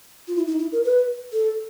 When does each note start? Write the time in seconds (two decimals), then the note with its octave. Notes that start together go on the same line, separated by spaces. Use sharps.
0.28 F4
0.36 E4
0.47 D#4
0.59 E4
0.72 A#4
0.84 B4
1.33 A4